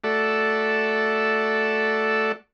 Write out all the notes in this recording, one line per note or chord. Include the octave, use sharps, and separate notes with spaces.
A3 F#4 A4 D5 E5